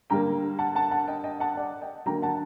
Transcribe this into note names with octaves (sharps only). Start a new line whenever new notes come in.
D3 G3 A#3 G5 A#5
F#5 A5
F#5 A5
F#5 A5
D#5 G5
D#5 G5
F#5 A5
D5 F#5
D#5 G5
D3 F#3 A#3 G5 A#5
F#5 A5